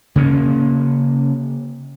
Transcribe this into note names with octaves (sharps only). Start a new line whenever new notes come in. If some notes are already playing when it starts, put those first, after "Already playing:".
C#3 A#3 C#4